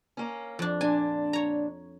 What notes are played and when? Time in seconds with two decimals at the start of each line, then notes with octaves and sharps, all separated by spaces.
0.17 A#3 C#4
0.59 F2 D4
0.81 A#2 D4 G#5
1.33 C#5 A#5